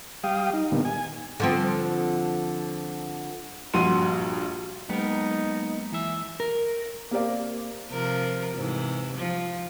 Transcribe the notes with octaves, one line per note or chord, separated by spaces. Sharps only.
G3 F5 G5 D#6
D#4
A#2 D3 D#3 G3 B3
G#5
D3 F3 C4
A#1 G2 F#4 C6 D#7
F#3 G#3 A#3 B3 D#4 A#4
E3 E5
A#4
A#3 C4 G4 A#4 D5 F5
C3 F3 A#4
G#2 C3 E3
F3